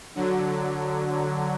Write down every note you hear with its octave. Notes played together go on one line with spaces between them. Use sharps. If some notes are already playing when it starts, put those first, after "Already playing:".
D3 F#3